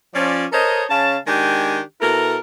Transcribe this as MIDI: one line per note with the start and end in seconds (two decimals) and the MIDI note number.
0.14 0.45 53
0.14 0.45 61
0.14 0.45 74
0.53 0.84 69
0.53 0.84 70
0.53 0.84 72
0.53 0.84 73
0.53 0.84 75
0.89 1.16 49
0.89 1.16 61
0.89 1.16 77
0.89 1.16 81
1.26 1.80 51
1.26 1.80 56
1.26 1.80 62
1.26 1.80 67
1.26 1.80 79
1.26 1.80 80
2.01 2.37 47
2.01 2.37 64
2.01 2.37 69
2.01 2.37 70